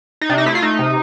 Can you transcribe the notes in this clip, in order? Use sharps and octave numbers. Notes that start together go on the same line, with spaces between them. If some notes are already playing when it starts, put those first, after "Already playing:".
D#4
C3 D4
D#4
A3 E4
F4
A3 D#4
C3